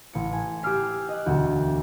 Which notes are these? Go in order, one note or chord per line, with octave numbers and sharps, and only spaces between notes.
A1 C#7
G#5
G4 G#5 D6 E6 F6 C7
D#5 F#6
E1 D2 F#4 G6